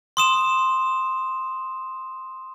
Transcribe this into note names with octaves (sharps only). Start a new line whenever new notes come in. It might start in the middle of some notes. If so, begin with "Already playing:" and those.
C6 D#6 E7